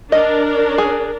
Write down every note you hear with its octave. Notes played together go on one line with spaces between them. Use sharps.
D4 A#4 D#5
G#4